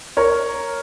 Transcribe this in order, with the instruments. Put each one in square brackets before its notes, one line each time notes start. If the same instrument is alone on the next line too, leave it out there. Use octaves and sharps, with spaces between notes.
[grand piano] A#4 C#5